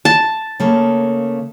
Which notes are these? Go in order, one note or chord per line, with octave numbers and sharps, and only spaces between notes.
A5
C#3 A3 A#3